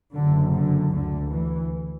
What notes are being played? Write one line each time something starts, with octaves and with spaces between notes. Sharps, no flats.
F#1 F#2 D3
D3
D2 D3
E3